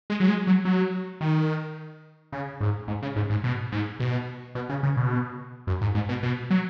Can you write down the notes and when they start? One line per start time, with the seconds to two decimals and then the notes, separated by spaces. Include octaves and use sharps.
0.10 G#3
0.20 F#3
0.28 G#3
0.47 F#3
0.65 F#3
1.21 D#3
2.32 C#3
2.61 G#2
2.88 G#2
3.02 C#3
3.16 G#2
3.30 G#2
3.44 B2
3.72 G#2
4.00 B2
4.55 B2
4.69 C#3
4.83 C#3
4.97 B2
5.67 F#2
5.81 G#2
5.95 G#2
6.09 B2
6.23 B2
6.50 F#3